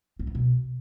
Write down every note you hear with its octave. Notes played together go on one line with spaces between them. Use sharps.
C4
B3
B2